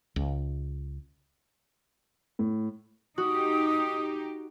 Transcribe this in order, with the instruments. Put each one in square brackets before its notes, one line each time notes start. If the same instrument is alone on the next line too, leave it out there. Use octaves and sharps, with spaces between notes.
[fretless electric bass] C#2
[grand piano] A2
[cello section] D#4 G4 [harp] F#4 [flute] D#6